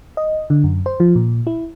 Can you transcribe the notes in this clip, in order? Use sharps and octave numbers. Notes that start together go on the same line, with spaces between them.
D#5
D3
F#2
C5
F3
A#2
E4